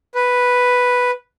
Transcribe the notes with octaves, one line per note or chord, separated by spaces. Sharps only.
B4